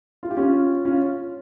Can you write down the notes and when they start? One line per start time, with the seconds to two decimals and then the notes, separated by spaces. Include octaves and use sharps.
0.23 F4
0.31 G4
0.37 C#4 F4
0.85 C#4 F4